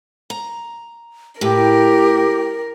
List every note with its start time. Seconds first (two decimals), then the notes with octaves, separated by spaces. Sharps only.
0.30 A#5
1.41 A2 G4 A#4